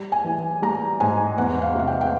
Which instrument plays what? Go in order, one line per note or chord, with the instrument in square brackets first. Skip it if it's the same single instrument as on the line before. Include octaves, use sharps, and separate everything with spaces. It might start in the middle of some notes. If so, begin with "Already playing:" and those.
Already playing: [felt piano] G3
G#5
E3
G3 A#5
G#2 G#5
E2 F#5
F5
C3 F#5
G5
G5